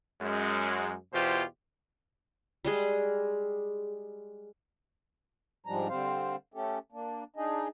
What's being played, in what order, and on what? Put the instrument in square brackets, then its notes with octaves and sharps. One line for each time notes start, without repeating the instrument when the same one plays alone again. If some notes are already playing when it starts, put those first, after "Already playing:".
[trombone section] F#2 G#3
E2 B2 E3 F4 G4 C5
[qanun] G3 G#3 G#4
[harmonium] G#2 F3 G3 G#3 D4 A#5
D3 G3 C4 C5 F5
A3 C#4 G4 A4
A#3 D4
D4 D#4 G#4 D#5